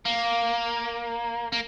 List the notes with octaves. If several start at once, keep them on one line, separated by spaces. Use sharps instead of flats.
A#3
A#3